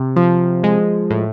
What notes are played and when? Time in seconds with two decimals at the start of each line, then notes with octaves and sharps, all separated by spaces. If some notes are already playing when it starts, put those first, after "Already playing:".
Already playing: C3
0.16 F3
0.64 G#3
1.11 A2